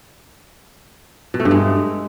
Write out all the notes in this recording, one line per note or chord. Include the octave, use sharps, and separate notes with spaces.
B2
A3
G2
G#3